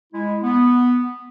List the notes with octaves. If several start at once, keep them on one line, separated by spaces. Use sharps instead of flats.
G#3 E4
B3